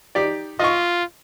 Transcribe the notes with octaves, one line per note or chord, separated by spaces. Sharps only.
D#4 G4 D5
F4 D#5 C#6